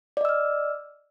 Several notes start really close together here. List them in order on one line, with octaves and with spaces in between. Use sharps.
D5 D#5 E6 F6